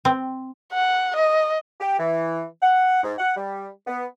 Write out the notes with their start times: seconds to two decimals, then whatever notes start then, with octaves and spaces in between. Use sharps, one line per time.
0.05 C4
0.73 F#5
1.16 D#5
1.80 G4
1.98 E3
2.62 F#5
3.03 G#2
3.19 F#5
3.37 G3
3.87 B3